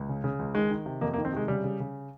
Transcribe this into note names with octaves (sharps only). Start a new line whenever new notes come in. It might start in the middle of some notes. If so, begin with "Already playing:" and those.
Already playing: C#2
C#3
C#3
C#2
D#3 G#3
D#3
C3
F2 A#3
A#3
D#3
C4
C3 G#3
C#3 G3
C#3
C#3